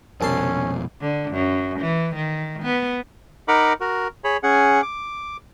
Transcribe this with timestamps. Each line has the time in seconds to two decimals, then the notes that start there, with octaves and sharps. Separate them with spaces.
0.21 C2 F2 B2 C#4 A5 C6
1.01 D3
1.32 F#2
1.79 E3
2.15 D#3
2.63 B3
3.48 D#4 A#4 F#5 B5 D6
3.81 F#4 A#4
4.24 G#4 C#5 B5
4.43 C#4 G#4 F#5
4.82 D6